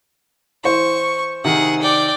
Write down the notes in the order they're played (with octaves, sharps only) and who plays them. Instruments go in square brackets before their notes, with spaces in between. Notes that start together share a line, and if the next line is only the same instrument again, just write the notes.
[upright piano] E3 C5 [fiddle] C#6
[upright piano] C3 D#3 [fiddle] G#4 F#5
[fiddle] D5 G5